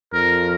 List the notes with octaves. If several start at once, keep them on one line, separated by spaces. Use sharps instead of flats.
F2 A#4